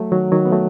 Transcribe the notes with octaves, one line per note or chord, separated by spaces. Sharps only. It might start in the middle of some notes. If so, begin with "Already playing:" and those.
Already playing: F#3 A3
D#3 F#3
D#3 F#3
B3
F#3 A3